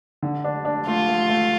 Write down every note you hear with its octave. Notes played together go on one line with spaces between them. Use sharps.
D3
D4
D4
A3 F4
A3
A3